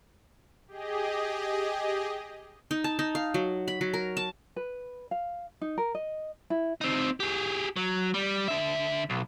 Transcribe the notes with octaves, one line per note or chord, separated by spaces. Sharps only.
G4 G#4 D#5
D#4
A5
D#4
F5
F#3
B5
F#3
A#4
A5
B4
F5
D#4
A#4
D#5
E4
C4 D#4
G4 G#4
F#3
G3
D3 E5
B1